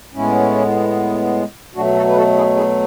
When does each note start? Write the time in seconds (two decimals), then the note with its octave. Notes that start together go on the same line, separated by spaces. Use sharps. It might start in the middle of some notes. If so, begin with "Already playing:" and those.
0.14 A2 G#3 B3 C#4 E4
1.75 B2 F#3 A3 D4 F#4
1.95 F#4 A4
2.08 B4
2.16 F#4 A4
2.35 E4 G#4
2.56 E4 G#4